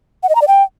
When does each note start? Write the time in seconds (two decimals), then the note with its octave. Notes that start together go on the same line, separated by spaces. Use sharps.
0.23 F#5
0.29 D#5
0.35 A#5
0.42 D5
0.48 G5